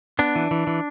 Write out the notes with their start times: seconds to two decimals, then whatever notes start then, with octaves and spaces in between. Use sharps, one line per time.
0.19 B3 D4
0.36 E3
0.51 E3
0.67 E3